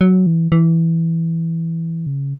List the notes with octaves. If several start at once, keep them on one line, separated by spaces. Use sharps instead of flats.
F#3
E3
E3
C#3